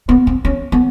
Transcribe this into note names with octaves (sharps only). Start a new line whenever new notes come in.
B3
C4
C#4
B3